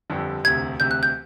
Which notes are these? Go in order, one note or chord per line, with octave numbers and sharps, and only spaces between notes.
G1 F2 D3 G3
E1 D2 C3 G#6
E1 D2 C3 G6
F#6
G6